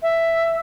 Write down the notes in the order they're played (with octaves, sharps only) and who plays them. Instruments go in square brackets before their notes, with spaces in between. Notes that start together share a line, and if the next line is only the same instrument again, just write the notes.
[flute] E5